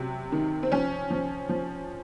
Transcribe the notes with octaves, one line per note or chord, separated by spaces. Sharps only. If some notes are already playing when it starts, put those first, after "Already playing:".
Already playing: C3 F#3
D#3
C4
F3 C#4
F3
F3